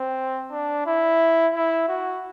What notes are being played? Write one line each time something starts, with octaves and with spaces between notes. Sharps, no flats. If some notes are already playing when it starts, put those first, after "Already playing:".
Already playing: C4
D4
E4
E4
F#4